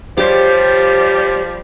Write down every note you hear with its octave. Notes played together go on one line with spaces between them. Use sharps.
F3 G3 G4 C5 C#5